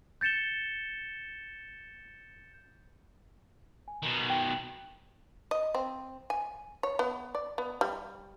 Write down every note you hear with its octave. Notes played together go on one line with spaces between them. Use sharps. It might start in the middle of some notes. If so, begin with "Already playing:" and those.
G6 A6 C#7 E7 G7
G#5
B2 D#3
G5
D#5
C4
G#5
C#5
B3
D5
B3
G3